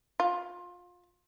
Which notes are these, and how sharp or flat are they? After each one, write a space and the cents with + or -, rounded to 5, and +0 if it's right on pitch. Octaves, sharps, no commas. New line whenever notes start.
F4 +25